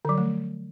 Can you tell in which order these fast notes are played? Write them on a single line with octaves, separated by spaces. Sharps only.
D3 F#3 F3 A3